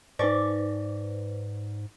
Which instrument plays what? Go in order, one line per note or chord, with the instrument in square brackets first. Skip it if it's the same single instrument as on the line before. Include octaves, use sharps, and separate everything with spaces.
[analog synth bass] G#2 [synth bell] D#4 B4 C5 [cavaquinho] D5 C#6 D6